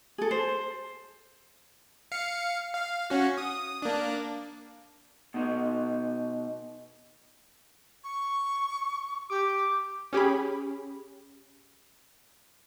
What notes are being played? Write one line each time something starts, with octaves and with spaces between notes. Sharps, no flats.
G#4 A4
C5
F5 C#7
F5
C#4 F#4
D#6
A#3 D4
B2 D#4
C#6
G4 D6
C#4 G4 G#4 B5